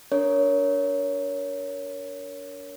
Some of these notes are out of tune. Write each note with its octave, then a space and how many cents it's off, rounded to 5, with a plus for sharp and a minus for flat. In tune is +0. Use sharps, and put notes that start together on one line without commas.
D4 -30 A#4 +0 C#5 +15